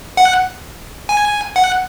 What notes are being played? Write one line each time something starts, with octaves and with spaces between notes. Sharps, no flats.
F#5
G#5
F#5